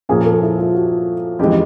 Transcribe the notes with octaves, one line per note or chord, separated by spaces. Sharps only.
A#2 F3 A#3 C#4 G#4
A4
E4
F4
F#4
F2 C#3 E3 G#3 G4